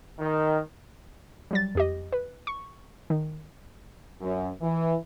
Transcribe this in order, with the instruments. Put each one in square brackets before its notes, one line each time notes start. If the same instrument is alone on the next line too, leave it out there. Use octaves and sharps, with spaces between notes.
[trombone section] D#3
[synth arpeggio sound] F#3 G3 A6
F2 G4 D#5
B4
C#6
D#3
[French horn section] F#2
E3